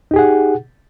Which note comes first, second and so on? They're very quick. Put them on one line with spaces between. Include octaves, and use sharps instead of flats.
D#4 G4 G#4 F#5